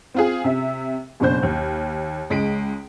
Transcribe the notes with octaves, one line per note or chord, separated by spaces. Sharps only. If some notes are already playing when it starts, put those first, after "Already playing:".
C4 F4 G#4
C3 E5
F#1 B2 D4 C5 G6
D#2
C#2 G#3 B6 D7